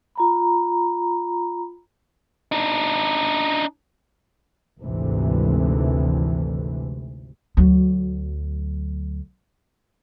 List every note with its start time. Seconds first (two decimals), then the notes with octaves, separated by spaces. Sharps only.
0.16 F4 A#5 B5
2.52 D4 D#4
4.81 G#1 D2 C3 E3
7.57 D2 F#3